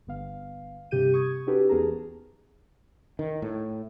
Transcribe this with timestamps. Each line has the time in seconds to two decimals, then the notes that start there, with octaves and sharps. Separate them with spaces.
0.07 G1 B3 F5
0.91 G2 C3 G4 G6 D#7
1.14 C#6 D#6 G#6
1.47 C#4 D#4 F#4 G4 A4 B4
1.69 E2 B3 G#4 A#4 A5 A#5
3.19 D#3
3.42 A2